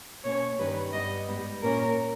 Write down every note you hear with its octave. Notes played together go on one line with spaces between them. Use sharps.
B2 A#3 C#4 C#5
G2 D#3 G3 C#4 B4
G2 G3 B3 D#5
G#2 G3 B3
A#2 A#3 C#4 A#4